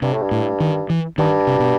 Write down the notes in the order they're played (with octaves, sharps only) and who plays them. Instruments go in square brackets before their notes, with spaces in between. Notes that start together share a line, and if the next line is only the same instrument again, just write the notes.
[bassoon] G2 [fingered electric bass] C3
[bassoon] A2
G2
[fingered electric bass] A2
D#3
E3
[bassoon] G2 [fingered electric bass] D#3
[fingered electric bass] C3
B2